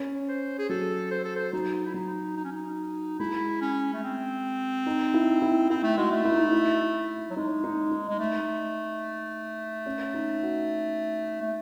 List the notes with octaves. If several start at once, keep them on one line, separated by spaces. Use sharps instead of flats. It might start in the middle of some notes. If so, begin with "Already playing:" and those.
Already playing: C#4
C5
G#4
F#3 A4
C5
A4
C5
F#3 D#4
E4
F#3 D#4
D#4
C#4
D#4
G#3 E4
C#4
A3
C4
D#4
E4
E4
C4 E4
A3
G#3 F#4
A3
E4
D#4
E4
E4
F#3
G#3 D#4
D#4
D#4
G#3
A3
C#4
D#4
F#4
A3